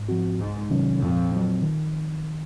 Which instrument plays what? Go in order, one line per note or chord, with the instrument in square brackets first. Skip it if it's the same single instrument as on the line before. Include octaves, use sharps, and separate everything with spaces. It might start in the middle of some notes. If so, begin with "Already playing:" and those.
Already playing: [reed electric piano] G#2
F3 C4 F#4
[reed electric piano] C2 [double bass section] G#2
[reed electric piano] C3 D#3 F#3 C#4
[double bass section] F2 [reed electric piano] A#2
[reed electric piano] F#3 C4
D#3